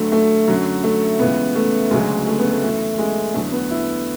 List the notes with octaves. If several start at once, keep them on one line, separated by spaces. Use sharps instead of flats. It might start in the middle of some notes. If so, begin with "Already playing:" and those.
Already playing: D2 D3 F#3 A3
A3
F#2 D3 F#3
A3
C#2 C#3 E3 B3
A3
D2 C#3 F#3 G#3
A3
B3
A3
F#2 E3 A3
G#3
E2 D3 F#3 A3
B3
E4